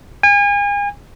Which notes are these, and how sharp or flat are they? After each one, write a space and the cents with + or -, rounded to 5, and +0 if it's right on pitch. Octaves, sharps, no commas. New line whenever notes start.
G#5 -35